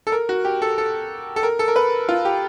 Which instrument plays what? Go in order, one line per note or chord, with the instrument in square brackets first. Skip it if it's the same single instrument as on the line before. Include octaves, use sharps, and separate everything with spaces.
[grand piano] A4
A#4
F#4
G4
A4
A4
A4
A#4
A4
A#4
B4
F4
G4